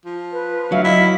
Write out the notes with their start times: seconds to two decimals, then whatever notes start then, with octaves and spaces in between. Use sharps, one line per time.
0.06 F3
0.32 B4
0.72 D2 F#3 E5 F5
0.84 E4 D#5 B6